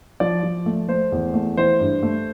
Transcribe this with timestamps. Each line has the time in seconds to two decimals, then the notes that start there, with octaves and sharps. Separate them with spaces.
0.20 F3 D5
0.43 F3
0.66 A3
0.88 A3 C5
1.12 E2
1.34 A3
1.57 E3 C5
1.80 G2
2.03 A3